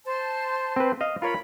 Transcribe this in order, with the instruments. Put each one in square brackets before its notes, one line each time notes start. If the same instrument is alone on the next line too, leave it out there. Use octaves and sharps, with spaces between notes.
[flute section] C5 A5
[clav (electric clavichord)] C4 B4
D#5 F5
[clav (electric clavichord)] F4 A#4 C#5 [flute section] B5